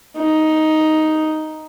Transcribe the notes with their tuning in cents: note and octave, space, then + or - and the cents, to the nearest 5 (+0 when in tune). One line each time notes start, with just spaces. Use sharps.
D#4 +5